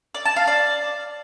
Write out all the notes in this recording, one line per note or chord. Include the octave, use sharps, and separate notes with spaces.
D5
A5
F5
D5